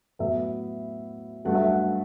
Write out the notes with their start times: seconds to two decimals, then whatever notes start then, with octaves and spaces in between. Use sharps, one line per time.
0.19 A2 F#3 B3 E5
1.45 G2 F#3 A3 F#5
1.55 E5
1.66 F#5